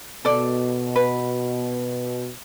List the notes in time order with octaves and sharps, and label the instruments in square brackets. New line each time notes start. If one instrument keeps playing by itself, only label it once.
[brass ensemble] B2 [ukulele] A4 D5
[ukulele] B4